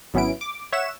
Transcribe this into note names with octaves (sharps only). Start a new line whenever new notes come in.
G#1 F#3 B3 C#4 E4 D7
D6
C#5 E5 F#5 E7